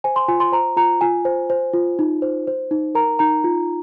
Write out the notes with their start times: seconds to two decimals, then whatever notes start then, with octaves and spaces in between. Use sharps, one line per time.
0.04 C5 G#5
0.16 C6
0.28 F4 G#5
0.40 C6
0.52 C5 A#5
0.76 F4 A#5
1.01 F4 G#5
1.25 C5
1.50 C5
1.73 F4
1.99 D#4
2.22 C5
2.47 C5
2.71 D#4
2.95 A#4 A#5
3.19 D#4 A#5
3.44 F4